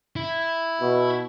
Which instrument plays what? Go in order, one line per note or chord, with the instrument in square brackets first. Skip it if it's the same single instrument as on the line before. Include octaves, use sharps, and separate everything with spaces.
[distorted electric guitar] E4
[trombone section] B2